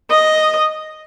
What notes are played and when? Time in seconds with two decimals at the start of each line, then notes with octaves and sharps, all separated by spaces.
0.11 D#5